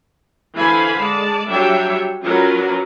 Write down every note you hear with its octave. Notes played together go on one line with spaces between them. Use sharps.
D3 E3 C5 F5 G#5 B5
G#3 D5 A5
F#3 G3 D4 C#5 E5 G5
F#3 C#4 F4 A#4 B4 D5